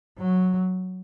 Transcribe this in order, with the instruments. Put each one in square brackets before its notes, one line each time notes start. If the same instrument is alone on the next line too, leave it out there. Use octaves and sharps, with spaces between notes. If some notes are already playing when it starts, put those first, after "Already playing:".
[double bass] F#3